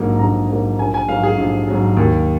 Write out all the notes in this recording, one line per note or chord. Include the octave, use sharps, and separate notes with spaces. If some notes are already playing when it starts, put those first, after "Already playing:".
Already playing: A#1 G#2 F#3 A#3
A#1 A#5
G#2 F#3 A#3
A#1 G#5
G#5
G#2 F#3 F5
G#4
A#1
G#2 F#3
D#2